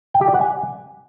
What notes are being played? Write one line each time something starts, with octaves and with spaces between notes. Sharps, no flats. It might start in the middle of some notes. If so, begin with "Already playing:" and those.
G5
G4
D5
F#5
G#5